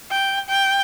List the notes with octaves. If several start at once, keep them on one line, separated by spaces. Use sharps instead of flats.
G5
G5